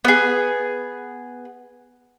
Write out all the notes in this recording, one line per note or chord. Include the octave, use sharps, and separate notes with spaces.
B3 G#4